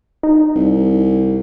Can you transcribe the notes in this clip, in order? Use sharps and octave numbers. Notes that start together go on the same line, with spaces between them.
D#4
C2